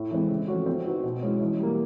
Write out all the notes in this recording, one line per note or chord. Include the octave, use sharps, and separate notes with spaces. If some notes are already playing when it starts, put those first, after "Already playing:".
Already playing: A2
E3 G#3 C4
C#3
F3 A3 C#4 F#4
C4
D#4 F#4 B4
B2
G#3 C#4 E4
E3
G3 A#3